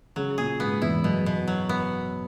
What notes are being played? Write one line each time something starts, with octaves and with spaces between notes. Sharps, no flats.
C#3 F#3
A#2 G#4
G#2 B3
E2 E4
F#2 B2
B2
F#3
B3